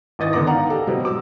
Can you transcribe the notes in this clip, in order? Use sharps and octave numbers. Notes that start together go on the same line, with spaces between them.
G#1 E3 D#5 A6
D3 D#3 B3 D6 A#6
D5 F5 F#5 A#5
G4 A4
B2 F#3 G3 C4
D6 E6